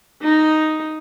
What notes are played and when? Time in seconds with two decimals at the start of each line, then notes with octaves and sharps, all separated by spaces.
0.22 D#4